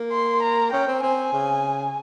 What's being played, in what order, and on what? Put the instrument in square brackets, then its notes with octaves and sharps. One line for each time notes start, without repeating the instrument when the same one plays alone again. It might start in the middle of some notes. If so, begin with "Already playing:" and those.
Already playing: [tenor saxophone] A#3
[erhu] C6
A#5
[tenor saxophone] C#4 [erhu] G5
[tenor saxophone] C4
[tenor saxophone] C4 [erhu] G#5
[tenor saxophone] C#3